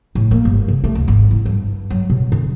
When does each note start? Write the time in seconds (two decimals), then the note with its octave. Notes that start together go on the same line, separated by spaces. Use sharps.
0.15 A2
0.31 A#3
0.45 G1
0.68 C3
0.84 A3
0.95 D2
1.08 G#1
1.31 E4
1.45 G2
1.90 F#3
2.10 B2
2.32 D3